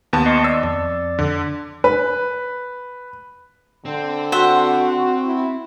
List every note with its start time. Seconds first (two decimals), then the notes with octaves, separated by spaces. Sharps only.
0.13 D#2 B3 A5
0.26 D#5 C6 C#6
0.44 D5 E6
0.63 F2 D5
1.19 D3
1.84 B4
3.85 D3 C4
4.32 F#4 C5 E5 F#5
5.24 E4